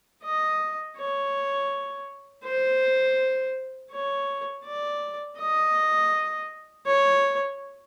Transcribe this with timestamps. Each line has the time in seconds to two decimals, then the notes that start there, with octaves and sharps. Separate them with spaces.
0.23 D#5
0.97 C#5
2.44 C5
3.91 C#5
4.64 D5
5.38 D#5
6.86 C#5